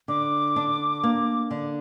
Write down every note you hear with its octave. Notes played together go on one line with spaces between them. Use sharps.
D3 D6
D4
A#3
D3